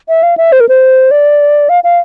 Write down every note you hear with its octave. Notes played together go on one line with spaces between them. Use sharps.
E5
F5
E5
C5
A#4
C5
D5
F5
F5